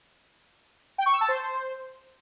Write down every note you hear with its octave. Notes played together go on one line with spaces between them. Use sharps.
G5
C#6
E6
A5
C5